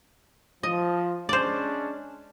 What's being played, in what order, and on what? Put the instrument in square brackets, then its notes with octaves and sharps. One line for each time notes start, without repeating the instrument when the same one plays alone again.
[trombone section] F3 [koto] D#5
[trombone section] G#3 C#4 D4 [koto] C5 D5